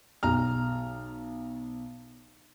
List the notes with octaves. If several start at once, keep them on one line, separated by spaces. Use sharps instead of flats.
B1 A#5 F6